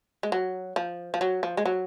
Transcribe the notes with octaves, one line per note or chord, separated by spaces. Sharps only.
G#3
F#3
F3
F3
F#3
F3
G#3
F#3